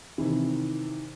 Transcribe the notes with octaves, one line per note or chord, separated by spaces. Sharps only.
C3 D#3 E3